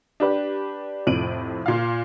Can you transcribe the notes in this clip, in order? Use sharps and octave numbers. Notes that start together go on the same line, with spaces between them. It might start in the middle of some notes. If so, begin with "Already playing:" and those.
D4 G4 B4
F2 A2 C3 D7 D#7 F#7
A#2 F5